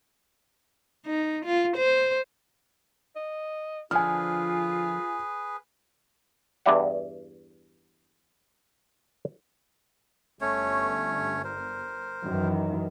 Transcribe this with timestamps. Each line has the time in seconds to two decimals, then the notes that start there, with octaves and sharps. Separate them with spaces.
1.06 D#4
1.45 F4
1.77 C5
3.16 D#5
3.91 D3 F3 D4 F4 G#4 B4 G#5 F6
6.66 E2 G2 E4 D5 E5 F#5
10.41 G1 A3 C#4 C#5
11.44 A#4 C5
12.24 F#2 D#3 E3